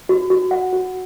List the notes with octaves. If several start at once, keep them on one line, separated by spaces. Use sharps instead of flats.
F#4
F#4
F#5
F#4